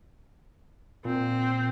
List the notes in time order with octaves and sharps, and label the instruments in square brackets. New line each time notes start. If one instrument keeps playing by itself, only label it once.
[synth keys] A#2 [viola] C4